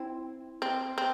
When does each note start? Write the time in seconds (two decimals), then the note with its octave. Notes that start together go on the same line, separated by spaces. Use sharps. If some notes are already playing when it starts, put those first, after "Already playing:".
Already playing: C4 E4
0.62 C4
0.98 C4